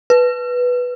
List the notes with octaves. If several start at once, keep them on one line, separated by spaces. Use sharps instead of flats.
B4